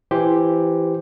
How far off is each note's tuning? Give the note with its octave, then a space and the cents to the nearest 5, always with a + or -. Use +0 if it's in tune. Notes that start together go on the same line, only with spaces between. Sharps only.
E3 +10 G4 +0 C5 +0